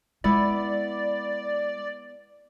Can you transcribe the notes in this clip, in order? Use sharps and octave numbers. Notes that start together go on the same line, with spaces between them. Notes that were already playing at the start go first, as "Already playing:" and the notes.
G#3 B3 E4 D5